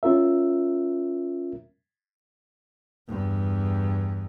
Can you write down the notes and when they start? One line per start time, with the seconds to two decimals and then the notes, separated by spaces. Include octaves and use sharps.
0.03 C#4 F4 A#4 E5
3.08 E2 G2